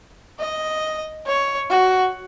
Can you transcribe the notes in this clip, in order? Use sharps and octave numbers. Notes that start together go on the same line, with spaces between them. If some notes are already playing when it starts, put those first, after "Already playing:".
D#5
C#5
F#4